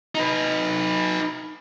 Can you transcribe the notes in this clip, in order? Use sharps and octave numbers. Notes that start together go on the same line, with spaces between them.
D#4 B4